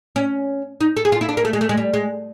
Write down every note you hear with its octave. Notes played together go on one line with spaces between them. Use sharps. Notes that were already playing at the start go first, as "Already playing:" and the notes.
C#4
D#4
A4
G#4
F4
E4
D4
A#3
A3
G#3
A3
G#3
G3
G#3